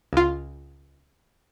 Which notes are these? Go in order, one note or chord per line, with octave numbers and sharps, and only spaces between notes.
C#2 F4